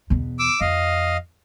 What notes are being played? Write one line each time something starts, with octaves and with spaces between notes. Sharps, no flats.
E2 B2
D6 E6
F2 D#5 F5